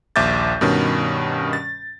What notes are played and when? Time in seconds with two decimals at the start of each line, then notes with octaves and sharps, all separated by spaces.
0.16 A#1 D#2 E5 D6 G6 A6
0.61 G2 B2 D#3 C#4
1.53 A6